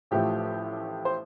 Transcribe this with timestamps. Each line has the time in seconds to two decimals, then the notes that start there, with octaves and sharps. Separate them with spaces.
0.11 A1 A2 F3 A3 G4
1.05 C5